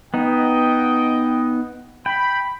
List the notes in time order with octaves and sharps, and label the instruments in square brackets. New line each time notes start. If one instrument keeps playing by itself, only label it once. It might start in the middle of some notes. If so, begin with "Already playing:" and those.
[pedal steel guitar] B3 D#4 [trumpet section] D#5 G5
[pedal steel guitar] G5 [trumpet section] B5